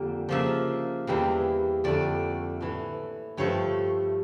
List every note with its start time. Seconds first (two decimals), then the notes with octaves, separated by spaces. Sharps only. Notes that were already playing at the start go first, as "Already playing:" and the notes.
Already playing: F2 D3 G3 A#3
0.29 C#3 F3 A#3 E5
1.07 E2 E3 G3 A#3
1.84 F2 D3 A3 D5
2.61 A2 E3 A3
3.37 G2 F3 A3 C#5